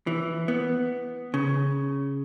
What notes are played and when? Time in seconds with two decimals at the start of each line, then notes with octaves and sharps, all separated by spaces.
0.07 E3
0.48 B3
1.34 C#3